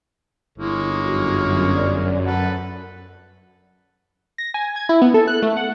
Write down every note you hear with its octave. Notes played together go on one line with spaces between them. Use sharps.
G1 G#3 A#3 E4 C#5
F#2 F#4
D5
A4 B4 F#5
A#6
G#5
G#6
E4
B3
A4
F#6
A3
F#5